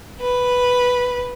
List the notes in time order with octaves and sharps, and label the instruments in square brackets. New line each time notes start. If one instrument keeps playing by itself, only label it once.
[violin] B4